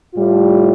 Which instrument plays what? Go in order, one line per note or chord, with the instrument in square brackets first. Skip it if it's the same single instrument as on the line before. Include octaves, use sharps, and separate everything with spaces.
[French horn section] A2 G3 F4